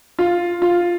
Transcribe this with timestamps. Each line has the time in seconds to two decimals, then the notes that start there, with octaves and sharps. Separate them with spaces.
0.19 F4
0.62 F4